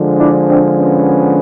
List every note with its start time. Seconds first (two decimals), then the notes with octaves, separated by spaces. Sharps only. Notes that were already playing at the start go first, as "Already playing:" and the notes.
Already playing: D3 F3 G#3
0.18 D4 E4
0.47 C4 D4
0.77 B3 C#4